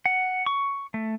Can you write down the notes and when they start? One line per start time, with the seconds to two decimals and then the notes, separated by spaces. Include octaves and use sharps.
0.06 F#5
0.46 C#6
0.94 A3